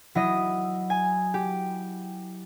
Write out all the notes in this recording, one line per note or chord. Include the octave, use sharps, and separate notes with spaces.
F#3 E4 D#5
G#5
G4